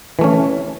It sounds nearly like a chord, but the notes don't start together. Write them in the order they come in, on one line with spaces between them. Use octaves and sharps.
E3 A3 C#4